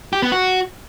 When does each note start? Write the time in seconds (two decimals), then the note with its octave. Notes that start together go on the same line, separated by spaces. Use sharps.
0.13 G4
0.22 B3
0.32 F#4